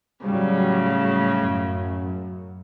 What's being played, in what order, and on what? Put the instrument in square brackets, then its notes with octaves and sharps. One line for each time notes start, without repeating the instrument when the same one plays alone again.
[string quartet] A2 C#3 [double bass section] F#3 G3
[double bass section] F#2